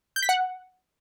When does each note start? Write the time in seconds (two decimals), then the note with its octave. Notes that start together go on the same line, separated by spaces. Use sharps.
0.16 G6
0.22 B6
0.29 F#5